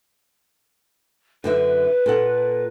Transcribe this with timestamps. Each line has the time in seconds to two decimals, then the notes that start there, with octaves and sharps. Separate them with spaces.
1.44 F#2 D3 B4 E5
2.06 A#2 A4 F#5